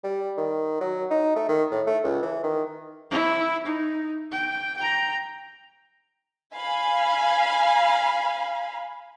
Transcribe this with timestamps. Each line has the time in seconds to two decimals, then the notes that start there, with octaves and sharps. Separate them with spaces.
0.04 G3
0.37 D#3
0.81 F#3
1.10 D#4
1.36 A3
1.48 D#3
1.71 A2
1.87 A3
2.04 C#2
2.23 E3
2.43 D#3
3.11 E4
3.66 D#4
4.32 G5
4.77 G5 A#5
6.55 F5 G#5 B5